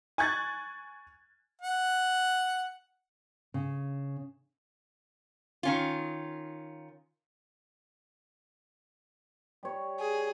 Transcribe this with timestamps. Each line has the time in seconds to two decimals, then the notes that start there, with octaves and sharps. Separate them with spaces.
0.18 G#5 C#6 F#6 G#6 A6
1.61 F#5
3.54 C#3
5.63 D#3 C#4 F4
9.63 G3 C#5
9.99 G#4